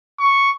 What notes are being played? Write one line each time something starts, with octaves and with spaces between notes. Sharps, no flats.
C#6